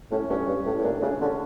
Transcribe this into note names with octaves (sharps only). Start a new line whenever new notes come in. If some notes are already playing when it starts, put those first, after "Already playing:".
A2 C#4
G2 C#4
G2
A2
A2
A#2 D4
C#3 D4
D3 C#4